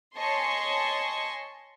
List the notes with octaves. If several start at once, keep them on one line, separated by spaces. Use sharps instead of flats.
C#5 D#5 G#5 A5 C6 C#6